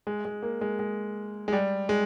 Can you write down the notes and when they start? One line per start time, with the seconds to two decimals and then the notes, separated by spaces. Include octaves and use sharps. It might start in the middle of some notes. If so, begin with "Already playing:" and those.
0.07 G#3
0.25 G#3
0.43 A#3
0.61 G#3
0.79 G#3
1.48 G#3
1.52 G3
1.89 G#3